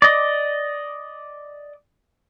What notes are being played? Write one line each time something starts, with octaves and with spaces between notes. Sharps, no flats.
D5 D#5